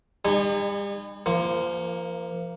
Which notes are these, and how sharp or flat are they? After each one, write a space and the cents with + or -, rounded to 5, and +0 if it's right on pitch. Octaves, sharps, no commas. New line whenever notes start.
G3 +40 D#4 -35 G#5 -10
F3 -30 A#3 +0